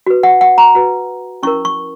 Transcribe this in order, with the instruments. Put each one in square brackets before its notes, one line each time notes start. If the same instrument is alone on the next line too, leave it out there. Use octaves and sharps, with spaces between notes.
[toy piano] F#4 B4
F#5
F#5
A#5
F#4 B4
C#4 E4 A#4 C#6
C#6